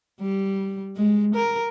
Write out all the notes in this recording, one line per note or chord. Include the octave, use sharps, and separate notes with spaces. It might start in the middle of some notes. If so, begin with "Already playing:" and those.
G3
G#3
A#4